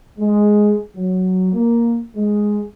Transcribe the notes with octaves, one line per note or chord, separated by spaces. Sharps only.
G#3
F#3
A#3
G#3